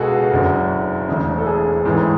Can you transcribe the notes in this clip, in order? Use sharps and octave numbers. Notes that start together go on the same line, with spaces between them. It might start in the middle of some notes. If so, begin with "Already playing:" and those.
Already playing: C#2 B2 F#4 G#4 A4
F#1 F#2 D3
E1 D2 D3
A4
G#4
A1 G#2 E3